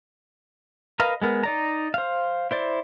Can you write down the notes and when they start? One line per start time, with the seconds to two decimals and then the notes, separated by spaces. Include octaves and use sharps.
1.00 A#4 B4 D#5 F5 A#5
1.22 G#3 B3 A#4
1.43 D#4 D5 A#5
1.94 C5 F5
2.51 E4 C5 D5